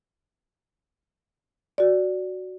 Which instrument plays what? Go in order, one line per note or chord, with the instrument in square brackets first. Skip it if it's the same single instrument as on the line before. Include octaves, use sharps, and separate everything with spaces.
[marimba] F#4 D5